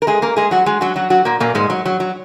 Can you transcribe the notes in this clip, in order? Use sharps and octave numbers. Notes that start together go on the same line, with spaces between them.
A#4
G#3 G#4
A#3 A#4
G#3 G#4
F#3 F#4
G#3 G#4
F#3 F#4
F#3 F#4
F#3 F#4
A#2 A#3
A#2 A#3
G#2 G#3
F#3
F#3
F#3